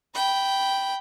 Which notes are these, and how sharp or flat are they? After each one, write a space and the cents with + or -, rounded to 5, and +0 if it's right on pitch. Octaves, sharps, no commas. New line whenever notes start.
G5 -5 B5 +0